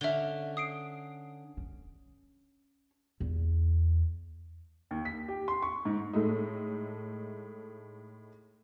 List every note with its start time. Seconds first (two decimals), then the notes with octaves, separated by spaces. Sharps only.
0.01 D3 C#4 E5 G7
0.57 D#6 C7 D7
1.57 C#4
3.20 E2
4.91 D#2
5.05 B6
5.28 G4
5.48 C6
5.62 C#6
5.85 G#2
6.13 A2 G#3 A3 D#4